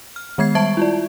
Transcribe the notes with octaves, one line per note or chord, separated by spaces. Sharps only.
F6
D#3 G#3 B3 G#6 C7
G3 E5 A5 C#6 G#6 D7
E4 F4 D5